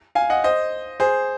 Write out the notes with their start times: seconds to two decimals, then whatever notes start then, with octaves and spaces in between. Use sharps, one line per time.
0.15 F5 G#5
0.30 D#5 F#5
0.44 C5 D#5
1.00 G#4 C5